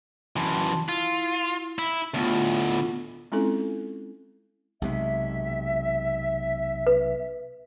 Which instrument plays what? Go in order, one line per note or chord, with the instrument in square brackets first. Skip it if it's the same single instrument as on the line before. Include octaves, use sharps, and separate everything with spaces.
[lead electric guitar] F#2 E3 [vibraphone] A5 C6
[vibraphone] E4 [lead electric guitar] F4
[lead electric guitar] E4
[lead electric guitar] D2 A2 [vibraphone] B3 F4
[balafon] G#3 C4 C#4 E4 F4 A4
[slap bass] B1 C3 G#3 [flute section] E5
[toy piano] B4